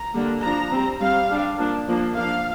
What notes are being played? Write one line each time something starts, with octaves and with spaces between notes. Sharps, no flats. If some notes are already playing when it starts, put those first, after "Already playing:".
Already playing: A#5
D3 G3 A#3 D4
F3 D4 A#5
G3 C4
G3 C4 F5
G3 D4
F3 A#3 D4
F3 A#3 D4
F3 A#3 D4 F5